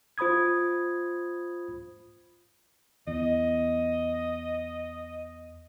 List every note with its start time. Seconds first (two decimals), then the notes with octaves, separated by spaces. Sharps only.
0.18 F4 C5 B5 D#6 G#6
3.07 E2 D#5